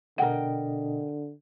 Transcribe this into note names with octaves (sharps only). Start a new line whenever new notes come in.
B2 D3 D4 A#4 D#5 F#5 G5